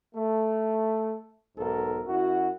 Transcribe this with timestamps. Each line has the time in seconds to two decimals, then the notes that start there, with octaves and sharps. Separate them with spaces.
0.14 A3
1.57 B1 G#2 A4 A#4
2.06 F#2 E4 F#4